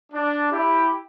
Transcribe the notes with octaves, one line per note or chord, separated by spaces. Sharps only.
D4
E4 G4